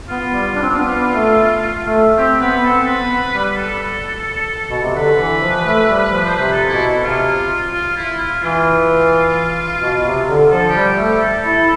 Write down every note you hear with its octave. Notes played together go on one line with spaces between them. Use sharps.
B3 F4
G3
D4
C4
D4
B3
A3
A3
C4 G4
B3 B4
C4 A4
B3 B4
G3
A4
B2
C3
D3 B4
E3
F3
A3
G3
F3
C5
C3 B4
A4
B2 E4
A4
C3 F4
F4
E4
F4
E3 F4
B2
C3
D3
F3 A4
G4
G3
A3
G4
A4
E4